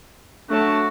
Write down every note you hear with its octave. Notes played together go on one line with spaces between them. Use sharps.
F#3 A3 D4 F#4 A5